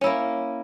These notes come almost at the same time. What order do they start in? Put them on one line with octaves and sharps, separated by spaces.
C#4 E4 A#3